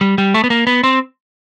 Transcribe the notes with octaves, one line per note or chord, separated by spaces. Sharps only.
G3
G3
A3
B3
A#3
B3
C4